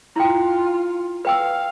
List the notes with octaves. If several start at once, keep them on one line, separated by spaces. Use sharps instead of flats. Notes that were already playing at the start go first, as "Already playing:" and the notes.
E4 F4 G5
B4 F5 G5 E6